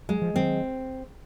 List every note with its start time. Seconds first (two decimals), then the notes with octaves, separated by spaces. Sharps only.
0.09 F#3 G#3
0.22 F3
0.34 D#3 F#3 C4